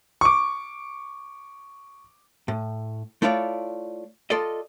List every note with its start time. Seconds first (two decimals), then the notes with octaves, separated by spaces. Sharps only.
0.21 C#6 D6
2.48 A2
3.22 A3 E4 F4 C#5 D5
4.30 F4 A4 D5 D#5